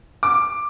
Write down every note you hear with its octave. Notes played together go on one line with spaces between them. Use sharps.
D6